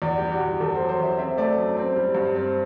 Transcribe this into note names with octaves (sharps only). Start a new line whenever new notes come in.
E2 D5
G4
G3
F#4
E2
E2 A4
C5
F#3
C5
E2 E5
C4 E5
A3 D5
F#2
C4
G3
G2
C4